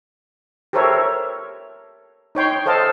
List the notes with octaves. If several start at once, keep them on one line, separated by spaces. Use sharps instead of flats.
G4 A4 A#4 C5 C#5 E5
D#4 C#5 G5 C6
A4 C5 D#5 F5 A5